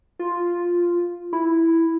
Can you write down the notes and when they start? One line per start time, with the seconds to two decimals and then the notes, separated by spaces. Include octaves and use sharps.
0.19 F4
1.33 E4